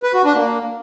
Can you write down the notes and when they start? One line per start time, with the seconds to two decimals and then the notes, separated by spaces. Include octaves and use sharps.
0.03 B4
0.14 F#4
0.24 D4
0.35 A#3